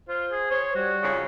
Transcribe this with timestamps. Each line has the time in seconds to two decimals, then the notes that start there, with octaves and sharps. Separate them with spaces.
0.09 F4 C5
0.31 G#4
0.51 C5 C#5
0.75 G3 F#4
1.02 F2 G#2 C#3